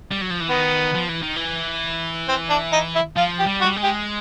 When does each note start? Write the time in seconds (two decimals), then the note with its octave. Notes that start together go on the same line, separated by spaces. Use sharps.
0.11 G3
0.21 F#3
0.30 F3
0.40 E3
0.50 D#3 B3
0.94 F3
1.09 E3
1.22 D#3
1.36 E3
2.28 C4
2.50 D4
2.72 D#4
2.95 E4
3.16 F3 F4
3.39 G4
3.47 G3
3.61 F#4
3.66 G3
3.76 G#3
3.83 G4